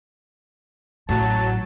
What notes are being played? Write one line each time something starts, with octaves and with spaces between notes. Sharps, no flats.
A1 F#3 A3 A5